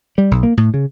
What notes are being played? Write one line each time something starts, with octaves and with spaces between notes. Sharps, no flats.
G3
B1
A#3
A2
C#3